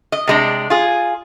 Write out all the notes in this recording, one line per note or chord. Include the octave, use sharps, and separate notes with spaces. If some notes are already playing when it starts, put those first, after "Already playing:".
D#5
C3 G#3 D4
F4 G#4